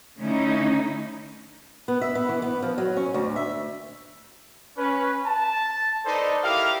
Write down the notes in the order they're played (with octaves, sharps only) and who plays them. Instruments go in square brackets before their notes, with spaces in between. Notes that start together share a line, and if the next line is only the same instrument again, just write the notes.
[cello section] D3 A3 C#4 D#4 E4
[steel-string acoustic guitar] B3
E5
B3
E3
B3
F3
F#3
C#4
D2
E5
[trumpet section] C#4 B4
A5
D#4 A4 B4 C5 D5 D#5
E4 G4 A4 A#4 F5